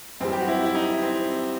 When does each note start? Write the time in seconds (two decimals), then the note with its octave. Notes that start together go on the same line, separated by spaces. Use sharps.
0.20 F#2 E3 G3 C4
0.32 G4
0.40 F#4
0.48 E4
0.65 E4
0.75 D#4
1.02 C4